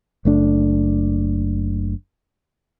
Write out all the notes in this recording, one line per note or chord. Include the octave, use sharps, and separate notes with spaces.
F#1 A3 D4